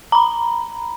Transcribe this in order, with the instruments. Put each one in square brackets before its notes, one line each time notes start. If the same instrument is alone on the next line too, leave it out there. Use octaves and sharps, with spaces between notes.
[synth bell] A#5 B5